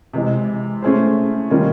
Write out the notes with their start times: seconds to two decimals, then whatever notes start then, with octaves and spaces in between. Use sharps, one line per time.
0.13 C3 E3 G#3
0.83 A3 C#4 E4 G#4 C5
1.50 D#3 G3 A#3 C#4 F4